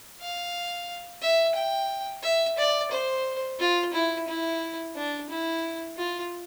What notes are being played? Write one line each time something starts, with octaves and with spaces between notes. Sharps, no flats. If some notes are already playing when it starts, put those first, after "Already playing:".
F5
E5
G5
E5
D5
C5
F4
E4
E4
D4
E4
F4